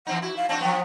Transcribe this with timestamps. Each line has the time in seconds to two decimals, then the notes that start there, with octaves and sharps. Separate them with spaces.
0.07 E3 C4 D#4 F#5
0.22 E4 F#4
0.37 F5
0.49 C4 D4 F#4 A5
0.61 F3 B3 G5